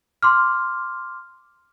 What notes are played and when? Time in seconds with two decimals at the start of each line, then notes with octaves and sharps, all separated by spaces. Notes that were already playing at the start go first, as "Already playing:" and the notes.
0.23 C6 D6 F6